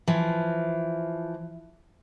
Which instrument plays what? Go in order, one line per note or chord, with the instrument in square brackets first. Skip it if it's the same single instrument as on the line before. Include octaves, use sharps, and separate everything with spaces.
[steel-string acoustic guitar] E3 F3